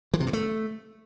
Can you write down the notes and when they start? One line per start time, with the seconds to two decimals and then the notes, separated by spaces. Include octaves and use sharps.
0.14 E3
0.20 C3
0.27 G2
0.33 A3